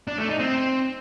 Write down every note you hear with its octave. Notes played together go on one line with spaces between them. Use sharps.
D4
A3
D#4
C4